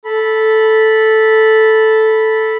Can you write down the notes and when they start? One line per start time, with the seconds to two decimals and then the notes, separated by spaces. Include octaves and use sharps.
0.05 A4 B5